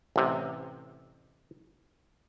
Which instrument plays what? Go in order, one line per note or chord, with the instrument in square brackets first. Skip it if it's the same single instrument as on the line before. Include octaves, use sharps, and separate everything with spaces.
[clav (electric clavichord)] A1 C3